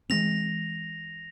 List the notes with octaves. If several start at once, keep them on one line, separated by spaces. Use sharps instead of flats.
E3 G#3 C4 A#6 F7